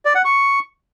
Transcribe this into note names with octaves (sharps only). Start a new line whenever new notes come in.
D5
F#5
C#6